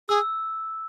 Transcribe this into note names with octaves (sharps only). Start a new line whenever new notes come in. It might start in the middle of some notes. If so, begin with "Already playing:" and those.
G#4 E6